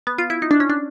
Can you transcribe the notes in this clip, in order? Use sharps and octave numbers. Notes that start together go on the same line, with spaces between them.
B3
F4
E4
D#4
D4
C#4
D4